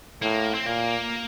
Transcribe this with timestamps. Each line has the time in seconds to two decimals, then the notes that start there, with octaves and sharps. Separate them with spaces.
0.22 A2 A#3
0.54 C4
0.66 A#2 A#3